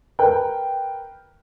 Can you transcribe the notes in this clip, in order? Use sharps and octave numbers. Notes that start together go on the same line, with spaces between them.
A#4 B4 G5